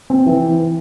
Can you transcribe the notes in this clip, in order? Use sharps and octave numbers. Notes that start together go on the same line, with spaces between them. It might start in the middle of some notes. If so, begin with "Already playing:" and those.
C4
E3